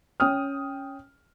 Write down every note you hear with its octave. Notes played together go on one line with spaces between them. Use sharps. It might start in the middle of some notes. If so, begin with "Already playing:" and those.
C#4 G5 D#6 F6